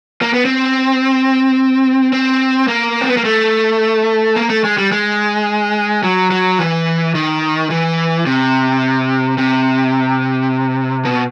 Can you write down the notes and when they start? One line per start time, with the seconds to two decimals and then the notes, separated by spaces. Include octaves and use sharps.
0.22 A#3
0.34 B3
0.45 C4
2.13 C4
2.68 A#3
3.01 C4
3.08 B3
3.17 A#3
3.25 A3
4.36 A#3
4.50 A3
4.64 G#3
4.78 G3
4.92 G#3
6.03 F#3
6.31 F#3
6.59 E3
7.15 D#3
7.70 E3
8.26 C3
9.38 C3
11.05 B2